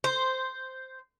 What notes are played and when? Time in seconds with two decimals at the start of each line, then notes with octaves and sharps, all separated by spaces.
0.04 C5